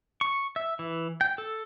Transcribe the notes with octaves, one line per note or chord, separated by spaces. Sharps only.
C#6
E5
E3
G5
A4